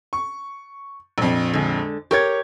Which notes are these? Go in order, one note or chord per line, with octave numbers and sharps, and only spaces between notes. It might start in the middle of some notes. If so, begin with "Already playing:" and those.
C#6
A#1 F2
D3 G#3
G4 A#4 C#5 C#6 G#6